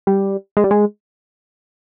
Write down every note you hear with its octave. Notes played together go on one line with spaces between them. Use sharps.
G3
G#3
G3
G#3